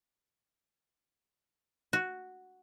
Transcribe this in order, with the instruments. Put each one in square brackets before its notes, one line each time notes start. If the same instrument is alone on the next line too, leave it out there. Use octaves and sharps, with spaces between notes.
[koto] F#4